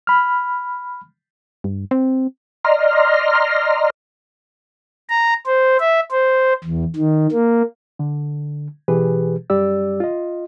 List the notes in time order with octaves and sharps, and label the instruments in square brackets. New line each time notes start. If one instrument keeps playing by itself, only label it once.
[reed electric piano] B5 F6
[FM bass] G2
C4
[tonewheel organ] D5 D#5 A#5 C6 F6
[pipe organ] A#5
C5
E5
C5
E2
D#3
A#3
[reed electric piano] D3
B2 E3 G4 G#4 B4
F#2 G3 G4 D5 E6
F4 D#5